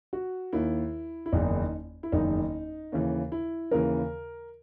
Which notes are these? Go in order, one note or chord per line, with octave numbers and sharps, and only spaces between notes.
F#4
D#2 D#3 E4
E4
F#1 E2 D#3 D#4
E4
F#1 E2 D#3 D#4
D#2 C#3 E3
E4
D#2 C#3 E3 A#4